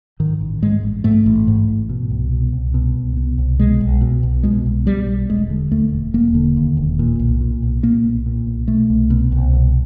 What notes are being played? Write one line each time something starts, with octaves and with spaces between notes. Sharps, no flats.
G#2 D#3
A1
G#2 G#3
A1
G#2 A3
A1
G#2
A1
B2
C2
B2
C2
B2
C2
B2
C2
B2 G#3
B1
B2
B1
B2 G#3
B1
B2 G3
B1
E1 G#3
D3
D#2 A3
E1
E1 A#3
D3
D#2
E1
A#2
B1
A#2
B1
A#2 A#3
B1
A#2
B1
B2 A3
C2
B2
C2
B2